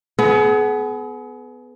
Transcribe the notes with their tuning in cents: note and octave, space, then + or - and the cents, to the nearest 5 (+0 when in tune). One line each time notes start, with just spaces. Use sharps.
B3 +15 G#4 +40